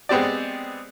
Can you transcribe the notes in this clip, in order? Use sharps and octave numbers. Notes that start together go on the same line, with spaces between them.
G#3 B3 C4 G4 D5